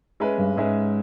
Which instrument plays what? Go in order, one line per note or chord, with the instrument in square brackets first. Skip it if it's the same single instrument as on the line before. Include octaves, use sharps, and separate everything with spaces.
[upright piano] G#3 C#4 G#4 B4 E5
[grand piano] G2
[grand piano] G#2 [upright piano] G#3 C#4 G#4 B4 E5